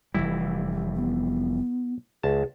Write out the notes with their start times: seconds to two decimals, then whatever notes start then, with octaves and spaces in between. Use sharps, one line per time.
0.15 F1 E3 G3 E4
0.96 B3
2.23 C#2 G#4 A5